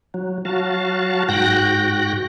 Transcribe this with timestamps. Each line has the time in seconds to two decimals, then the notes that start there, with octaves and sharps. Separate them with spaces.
0.14 F#3
0.45 F#3 F#4 F5 A5
1.29 G#2 F#4 G5 F#6 A#6